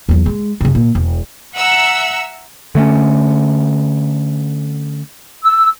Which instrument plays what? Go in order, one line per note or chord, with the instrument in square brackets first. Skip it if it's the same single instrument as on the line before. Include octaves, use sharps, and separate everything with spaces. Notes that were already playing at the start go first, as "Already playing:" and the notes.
[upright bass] E2 F#3
G#3
F#2 C#3
A#2
E1
[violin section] E5 A#5 E6 [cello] F#5
[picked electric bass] D3 A3 A#3 C#4
[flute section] E6